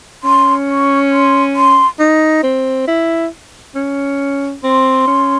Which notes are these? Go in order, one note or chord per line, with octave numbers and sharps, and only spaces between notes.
C#4 C6
C#6
C6
C6
D#4
C4
E4
C#4
C4 C6
C#4